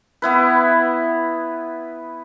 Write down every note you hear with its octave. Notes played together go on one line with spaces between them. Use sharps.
B3 E4 B4